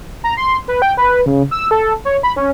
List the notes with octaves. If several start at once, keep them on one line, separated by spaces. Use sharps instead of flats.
A#5
C6
B4
G5
B4
C#3
E6
A4
C#5
B5
C#4